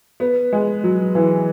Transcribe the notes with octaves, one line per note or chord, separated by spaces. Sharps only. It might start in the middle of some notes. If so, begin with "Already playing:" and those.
B3
G#3
F#3
E3